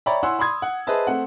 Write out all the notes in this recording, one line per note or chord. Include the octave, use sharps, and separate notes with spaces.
C#5 D5 E5 G5 A#5 B5
E4 C#5 F#5 G#5 C6 E6
B5 C6 D#6 G#6
F#5
G#4 B4 C5 D#5 E5 A5
A3 C4 F#5